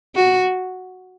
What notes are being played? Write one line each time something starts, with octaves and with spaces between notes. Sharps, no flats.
F#4